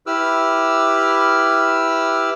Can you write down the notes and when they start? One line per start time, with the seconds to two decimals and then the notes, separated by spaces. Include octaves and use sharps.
0.06 E4 G4 B4 D6 E6 F6